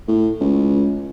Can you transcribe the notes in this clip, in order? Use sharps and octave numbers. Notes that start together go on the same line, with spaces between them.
A2
C#2